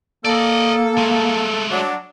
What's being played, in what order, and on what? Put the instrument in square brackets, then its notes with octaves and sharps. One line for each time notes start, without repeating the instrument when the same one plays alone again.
[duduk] A#3 [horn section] A4 [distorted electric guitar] D5 D#5
[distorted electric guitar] G#3 A3
[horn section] F#3 D4